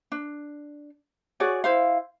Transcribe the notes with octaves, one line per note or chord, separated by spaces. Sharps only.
D4
F#4 G#4 C#5 D5
E4 C5 F5